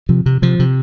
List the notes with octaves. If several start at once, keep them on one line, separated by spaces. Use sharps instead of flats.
C3 F3
C3
C3 F3
C3